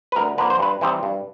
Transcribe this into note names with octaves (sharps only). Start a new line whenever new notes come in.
B4
D2 A#4
D3 F3 A#3 B4
C5
G2 B4
E3 G3 C4 D#4
G2